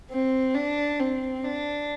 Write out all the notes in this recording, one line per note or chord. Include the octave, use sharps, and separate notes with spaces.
C4
D4
C4
D4